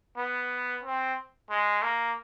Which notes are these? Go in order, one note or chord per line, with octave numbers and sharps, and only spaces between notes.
B3
C4
G#3
A#3